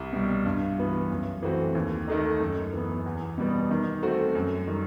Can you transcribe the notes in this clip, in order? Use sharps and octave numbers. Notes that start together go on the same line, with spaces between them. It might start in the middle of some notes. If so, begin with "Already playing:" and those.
Already playing: C2
B2 G3
G2
E3 B3 F#4
F#2
E3 A3 C4 F#4
D#2
D#3 A3 D#4
F#2
E3 B3
E2
B2 G3 B3
D#3
A3 C4 F#4
F#2
D#3 G3